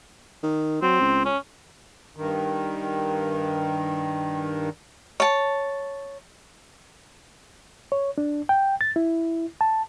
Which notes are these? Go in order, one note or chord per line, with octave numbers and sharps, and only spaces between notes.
D#3
F#3 C4
C#2
C#4
G2 D#3
C#5 A5
C#5
D4
G5
A6
E4
A5